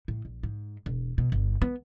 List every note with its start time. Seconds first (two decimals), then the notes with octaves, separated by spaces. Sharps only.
0.08 A2
0.25 A#1
0.43 G#2
0.86 E1
1.18 B2
1.32 G1
1.62 B3